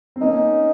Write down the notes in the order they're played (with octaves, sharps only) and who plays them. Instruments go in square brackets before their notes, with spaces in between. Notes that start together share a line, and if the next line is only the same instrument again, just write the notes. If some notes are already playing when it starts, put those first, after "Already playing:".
[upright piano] C4
[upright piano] A#3 C#4 [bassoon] D#4